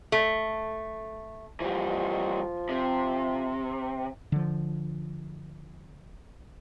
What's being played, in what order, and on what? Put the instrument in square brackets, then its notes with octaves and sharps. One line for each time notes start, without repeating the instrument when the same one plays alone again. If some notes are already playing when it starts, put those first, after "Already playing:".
[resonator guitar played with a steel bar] A3
[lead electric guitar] E3 G3 [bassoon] F3
[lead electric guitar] C3
[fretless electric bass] D3 F3